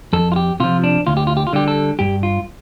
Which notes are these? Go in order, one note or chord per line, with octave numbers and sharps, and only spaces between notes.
F2 A4
F4
G4
C3 F3 F4
D4
D2 F4
G4
F4
G4
F4
D3 G3 G4
A4
G2 G4
F4